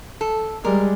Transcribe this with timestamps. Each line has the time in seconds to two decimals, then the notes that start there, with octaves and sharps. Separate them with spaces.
0.21 A4
0.64 G3 G#3 A#4